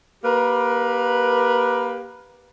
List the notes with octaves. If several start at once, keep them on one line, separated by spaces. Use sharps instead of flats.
A#3 G4 A#4 B4